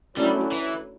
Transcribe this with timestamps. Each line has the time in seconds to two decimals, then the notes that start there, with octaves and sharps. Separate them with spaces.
0.17 D3 F#3 G3 A3 C#4 E4
0.52 E3